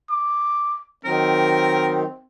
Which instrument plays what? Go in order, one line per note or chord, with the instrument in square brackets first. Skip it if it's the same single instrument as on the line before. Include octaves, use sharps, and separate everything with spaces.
[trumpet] D6
[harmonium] D#3 F#3 D#4 [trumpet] C4 [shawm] A#4